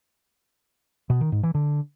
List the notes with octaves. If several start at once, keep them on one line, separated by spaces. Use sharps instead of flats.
B2
D#3
G#2
E3
D3